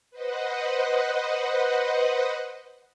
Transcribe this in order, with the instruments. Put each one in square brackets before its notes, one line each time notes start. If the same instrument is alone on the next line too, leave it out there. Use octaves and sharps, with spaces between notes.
[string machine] B4 C5 D#5 F#5